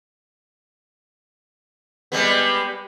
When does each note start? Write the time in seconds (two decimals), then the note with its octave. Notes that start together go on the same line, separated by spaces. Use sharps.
2.12 G3 G#3 B3